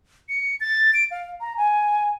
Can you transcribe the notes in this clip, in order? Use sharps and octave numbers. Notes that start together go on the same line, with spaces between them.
C#7
A6
D7
F5
A#5
G#5